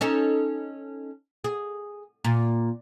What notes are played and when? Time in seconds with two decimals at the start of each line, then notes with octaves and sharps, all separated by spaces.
0.01 C#4 D#4 A4
1.44 G#4
2.24 A#2